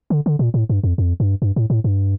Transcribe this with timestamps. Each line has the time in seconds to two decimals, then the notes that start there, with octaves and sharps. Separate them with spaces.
0.10 D3
0.26 D3
0.39 A#2
0.54 A2
0.69 G2
0.83 F2
0.98 F2
1.20 G2
1.42 G2
1.56 A2
1.70 A2
1.84 G2